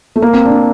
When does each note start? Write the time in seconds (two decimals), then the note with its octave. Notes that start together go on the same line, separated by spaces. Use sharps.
0.16 A3
0.22 A#3
0.33 C4
0.45 D4